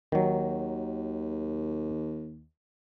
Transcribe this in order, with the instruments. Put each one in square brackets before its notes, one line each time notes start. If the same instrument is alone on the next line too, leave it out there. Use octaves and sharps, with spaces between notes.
[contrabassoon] D#2 [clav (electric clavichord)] D#3 F#3